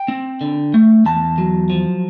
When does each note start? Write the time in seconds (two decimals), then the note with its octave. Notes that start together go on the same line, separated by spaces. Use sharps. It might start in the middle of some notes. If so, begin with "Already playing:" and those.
Already playing: G5
0.08 C4
0.41 D3
0.74 A3
1.06 E2 A5
1.38 F#3
1.70 F3